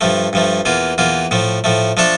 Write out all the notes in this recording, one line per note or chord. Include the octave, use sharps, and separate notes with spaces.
G2 F3 A3
G2 F3 A3
E2 E3 A#3 F4
E2 E3 A#3 F4
A2 F3 A3
A2 F3 A3
F3 A3 D4 A4